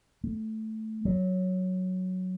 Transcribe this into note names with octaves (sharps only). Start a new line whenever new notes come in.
A3
F#3